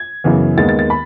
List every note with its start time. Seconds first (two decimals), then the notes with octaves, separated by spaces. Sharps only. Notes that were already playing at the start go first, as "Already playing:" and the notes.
Already playing: G#6
0.24 F#2 C#3 E3 B3
0.57 D#2 D#3 G#3 B3 A6
0.69 A6
0.79 A6
0.90 B5